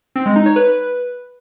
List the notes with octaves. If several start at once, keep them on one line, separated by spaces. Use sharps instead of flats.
C4
G#3
D#4
C#5
B4